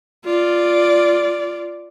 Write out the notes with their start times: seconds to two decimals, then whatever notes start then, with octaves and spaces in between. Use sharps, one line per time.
0.25 F4 D5